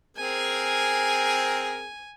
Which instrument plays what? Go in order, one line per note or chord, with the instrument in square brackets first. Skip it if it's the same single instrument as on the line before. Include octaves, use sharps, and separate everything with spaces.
[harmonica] C4 G#4 A#4 [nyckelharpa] G#5